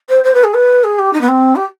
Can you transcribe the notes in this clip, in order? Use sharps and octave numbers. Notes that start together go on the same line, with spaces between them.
C5
C5
B4
G#4
B4
G#4
G4
D#4
B3
C4
G4